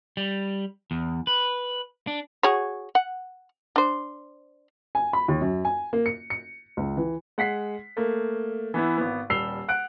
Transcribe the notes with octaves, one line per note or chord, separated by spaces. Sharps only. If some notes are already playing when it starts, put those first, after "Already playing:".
G3
E2
B4
D4
F#4 G#4 C#5
F#5
D4 C5
G#5
B5
D#2
F#2
G#5
A#3
C#7
C#7
C#2
E3
G#3 F#5 B6 C7
A3 A#3
E3 B3 E4
G#1 B3
D#1 G3 E6 C7 F7 G7
F#5 F#6 D7